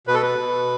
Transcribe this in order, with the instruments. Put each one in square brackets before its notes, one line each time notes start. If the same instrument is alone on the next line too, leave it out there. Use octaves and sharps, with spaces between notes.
[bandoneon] B2 B4
A4
B4
B2